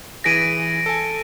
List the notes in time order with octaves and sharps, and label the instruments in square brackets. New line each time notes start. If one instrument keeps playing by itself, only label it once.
[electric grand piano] E3 G#4 B6 [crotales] A#6 D7 D#7
[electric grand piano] A4 G#5